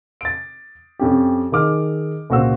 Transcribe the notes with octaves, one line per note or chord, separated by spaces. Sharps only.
A6 D7
F2 C#4 G4
D#3 G#4 D6 F6
C#2 A#2 F#4 C5 E6